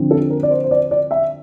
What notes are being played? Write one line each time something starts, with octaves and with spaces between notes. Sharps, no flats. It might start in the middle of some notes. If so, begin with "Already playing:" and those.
Already playing: D3 F3 C4
A4
A#4
D5
C5
C5
D5
D5
E5